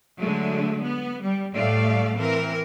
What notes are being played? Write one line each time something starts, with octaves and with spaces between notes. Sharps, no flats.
D3 F#3 G#3 A3
B3
G3
A2 G3 A3 D5 F5
E3 C4 A#4